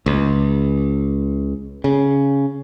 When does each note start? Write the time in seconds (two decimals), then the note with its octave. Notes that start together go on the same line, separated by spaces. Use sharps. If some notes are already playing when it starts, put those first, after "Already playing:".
0.06 C#2
1.84 C#3